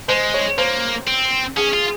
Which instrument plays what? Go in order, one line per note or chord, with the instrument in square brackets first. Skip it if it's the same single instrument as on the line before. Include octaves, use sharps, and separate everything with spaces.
[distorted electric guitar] G#3 [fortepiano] C5
[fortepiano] C#5
[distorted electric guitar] A#3 [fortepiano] C5
[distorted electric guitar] C4
[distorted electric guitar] C#4 [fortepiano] G#4
[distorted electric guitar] F4